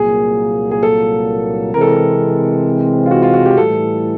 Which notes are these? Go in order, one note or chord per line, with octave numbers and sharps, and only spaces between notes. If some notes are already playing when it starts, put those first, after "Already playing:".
Already playing: C2 A#2 F#3 A#3 G#4
G#4
A4
C3 E3 G#3 C4 A#4
A4
A#4
F4
F#4
F4
F#4
G4
A2 E3 G3 A4